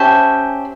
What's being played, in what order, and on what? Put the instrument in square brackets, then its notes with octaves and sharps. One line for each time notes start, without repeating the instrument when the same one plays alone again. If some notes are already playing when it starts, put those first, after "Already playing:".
Already playing: [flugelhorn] C#4 [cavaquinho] G4 C5 E5 A5